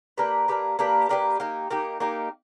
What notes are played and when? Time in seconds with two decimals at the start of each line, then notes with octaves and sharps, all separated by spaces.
0.18 A#3 D4 G4 B4
0.48 A#3 D4 G4 B4
0.79 A#3 D4 G4 B4
1.09 A#3 D4 G4 B4
1.40 A#3 D#4 G4
1.70 A#3 D#4 G4
2.00 A#3 D#4 G4